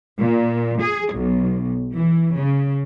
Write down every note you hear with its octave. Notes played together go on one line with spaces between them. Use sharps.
A#2
G#4
B1
E3
C#3